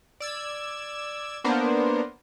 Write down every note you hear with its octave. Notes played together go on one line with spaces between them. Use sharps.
D5 E6 G#6
A#3 B3 D4 A#4 C5